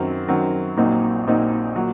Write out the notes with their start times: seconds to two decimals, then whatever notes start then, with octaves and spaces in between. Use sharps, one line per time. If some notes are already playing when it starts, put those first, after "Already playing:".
Already playing: F#2 D#3 F#3 C4
0.28 F#2 D#3 F#3 C4
0.77 A#1 A#2 F#3 C4 D#4
1.27 A#1 A#2 F#3 C4 D#4
1.75 A#2 F#3